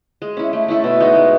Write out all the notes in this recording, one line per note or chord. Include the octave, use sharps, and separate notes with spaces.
G#3
C#4 E4
A3
C#4 E4 A4
B2
G#3 D#4 F#4
G#3